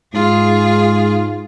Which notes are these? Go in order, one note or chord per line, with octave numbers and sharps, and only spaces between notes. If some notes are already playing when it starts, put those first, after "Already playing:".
G#2 F4 G#4